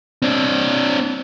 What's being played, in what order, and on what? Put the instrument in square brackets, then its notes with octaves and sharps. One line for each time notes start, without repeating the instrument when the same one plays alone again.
[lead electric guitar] C4 D4